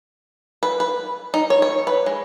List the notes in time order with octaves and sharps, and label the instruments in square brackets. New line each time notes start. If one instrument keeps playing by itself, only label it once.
[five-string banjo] B4
B4
D#4
C#5
C#5
B4
G#3